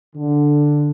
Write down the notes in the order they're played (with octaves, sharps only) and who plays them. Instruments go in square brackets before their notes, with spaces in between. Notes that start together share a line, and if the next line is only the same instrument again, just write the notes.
[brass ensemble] D3